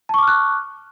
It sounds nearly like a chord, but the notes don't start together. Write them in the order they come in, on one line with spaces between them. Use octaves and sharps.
A5 C#6 D6 F6 F#6